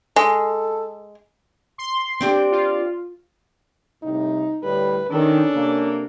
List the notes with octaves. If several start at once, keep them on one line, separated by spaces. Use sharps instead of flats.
G#3 A4
C6
C4 D4 G4
F4
C2 A2 C3 D#4
D2 A2 G3 B4
D#3 C#4 D4 A4
C3 A#3